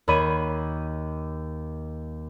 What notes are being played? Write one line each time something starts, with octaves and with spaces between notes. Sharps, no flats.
D#2 C#5 B5 G#6 D#7